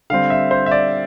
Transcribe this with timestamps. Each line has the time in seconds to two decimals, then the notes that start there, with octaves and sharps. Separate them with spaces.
0.10 D3 G3 C4 F5
0.30 E5
0.51 C5
0.66 E5
0.71 D5